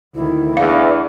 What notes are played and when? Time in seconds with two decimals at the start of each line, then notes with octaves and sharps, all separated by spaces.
0.15 D2 D#3 E4
0.57 E2 D4 F5